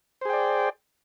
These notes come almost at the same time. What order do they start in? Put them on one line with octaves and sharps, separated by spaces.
C5 G#4 G5 D5